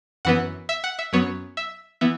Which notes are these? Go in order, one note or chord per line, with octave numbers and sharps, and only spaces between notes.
F#2 E3 B3 F#5
E5
F#5
E5
F#2 F#3 B3 C#5
E5
E3 B3 E5